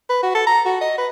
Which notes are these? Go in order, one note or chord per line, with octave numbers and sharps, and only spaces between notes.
B4
F#4
A4
A#5
F#4
D#5
B4